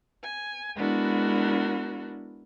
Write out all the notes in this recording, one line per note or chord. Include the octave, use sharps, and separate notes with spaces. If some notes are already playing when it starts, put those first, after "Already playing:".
G#5
G#3 B3 D4 E4 F#4 A#4